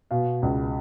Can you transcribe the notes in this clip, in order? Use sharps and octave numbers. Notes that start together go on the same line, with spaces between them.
B2 F5
C#2